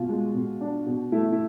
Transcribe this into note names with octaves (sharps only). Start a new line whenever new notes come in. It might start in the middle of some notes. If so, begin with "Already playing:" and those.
Already playing: B2 F4
G#3
B2
D4
B2
A3 E4
E4